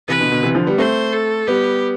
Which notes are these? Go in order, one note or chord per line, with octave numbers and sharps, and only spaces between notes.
C3 E3 B4
B2 D3
B2 D3
C3 E3
D3 F3
G3 B3
A3 C4 C5
A4
G3 B3 G4